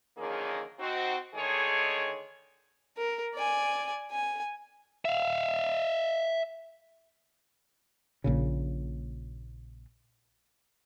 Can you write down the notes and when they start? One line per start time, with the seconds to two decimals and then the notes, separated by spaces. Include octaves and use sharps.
0.18 D3 D#3 F3 A#3 C#4 G#4
0.79 C4 D#4 F#4
1.35 D3 D#3 G#3 A3 G#4 C#5
2.97 A#4
3.34 D5 G#5
4.11 G#5
5.05 E5 F5
8.24 A#1 A#2 C#3